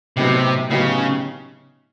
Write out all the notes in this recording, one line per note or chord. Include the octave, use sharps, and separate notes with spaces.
A2 C3 F#3 B3 D#4 G4
A2 C#3 F#3 B3 D#4 G4